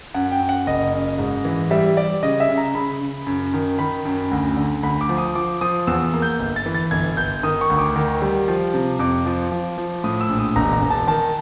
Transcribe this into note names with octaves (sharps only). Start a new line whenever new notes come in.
F#2 F#5
G5
F#2
F#5
F#1 D#5
F#2
G#2
E3
G3 E5
G3 D5
C#3 D#5
E5
C#3
A#5
C#3 B5
C#3
F#2
D#3
D#3 B5
F#2
D2
D3
D2 B5
D6
F3
D#6
F3 D6
F3 D#6
E2 E6
A#3
G6
G1
A6
E3
A6
G1 G#6
G1 G6
D#3 D#6
C#6
D2
D6
D#3
G3
F3
C3
F2 D6
F3
F3
F3
A2 D#6
E6
A#1
D#6
E1 A#5
A#5
E1
A5
D#3 A5